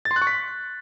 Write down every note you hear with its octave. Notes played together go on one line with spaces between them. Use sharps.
A6
C6
F#6
C#6
B6